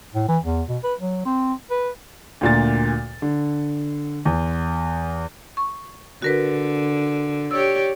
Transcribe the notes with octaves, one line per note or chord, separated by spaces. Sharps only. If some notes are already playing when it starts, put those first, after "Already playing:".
A2
E3
E2
B2
B4
F#3
C4
B4
D2 A#2 A6
D3
E2
C#6
D3 F#4 A#4 B4
G4 C#5 D5 E6